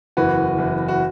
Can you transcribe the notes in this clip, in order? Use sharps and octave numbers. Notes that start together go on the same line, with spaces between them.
F#1 E2 E3 F#4 B4
F#1 E2 E3
F#4